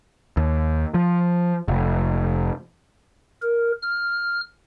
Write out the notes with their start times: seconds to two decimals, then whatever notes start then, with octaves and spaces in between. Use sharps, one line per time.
0.37 D#2
0.94 F3
1.68 F1
3.42 A#4
3.83 F6